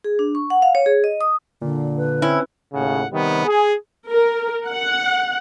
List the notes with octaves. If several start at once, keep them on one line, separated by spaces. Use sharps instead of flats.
G#4
D4
C#6
F#5
F5
C#5
G#4
D#5
D#6
A#2 D3
B4
C4 C#4 E4
D#2 A2 C#3 F#5
C3 D#3 G3 B3
G#4
A#4
F#5